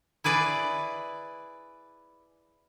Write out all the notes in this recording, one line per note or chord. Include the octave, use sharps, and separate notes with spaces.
E4 G#4 B4 D5